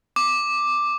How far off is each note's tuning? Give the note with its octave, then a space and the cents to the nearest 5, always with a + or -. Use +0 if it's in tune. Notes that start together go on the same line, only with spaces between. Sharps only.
D6 +5